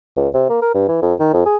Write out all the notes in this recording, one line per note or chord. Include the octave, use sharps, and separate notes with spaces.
C#2
C3
A#3
A#4
G2
E3
F2
D#3
F2
G#4